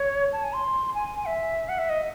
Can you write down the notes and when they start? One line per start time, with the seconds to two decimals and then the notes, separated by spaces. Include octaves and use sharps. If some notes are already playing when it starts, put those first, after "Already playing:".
Already playing: C#5
0.32 A5
0.43 G#5
0.53 C6
0.95 G#5
1.16 G#5
1.27 E5
1.69 F#5
1.78 E5
1.89 D#5